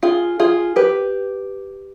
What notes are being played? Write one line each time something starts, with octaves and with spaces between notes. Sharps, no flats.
F4 G#4
F4 G#4
G4 B4